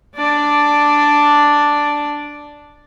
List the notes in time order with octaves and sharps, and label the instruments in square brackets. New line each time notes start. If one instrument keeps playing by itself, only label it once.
[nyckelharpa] D4 D5